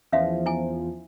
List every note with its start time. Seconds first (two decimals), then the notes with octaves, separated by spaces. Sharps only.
0.12 E2 F3 C#4 E5 F5
0.46 E4 G#5